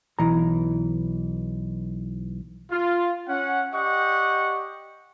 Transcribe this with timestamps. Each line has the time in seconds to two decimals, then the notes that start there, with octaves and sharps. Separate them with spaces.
0.19 B1 E3 A#5
2.71 F4
3.29 C#4 F#5
3.74 G4 D5 D#5 F#5 G5 C#6